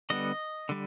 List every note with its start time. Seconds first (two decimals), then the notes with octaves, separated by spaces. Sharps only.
0.10 D3 G3 B3 D#5
0.69 D3 G3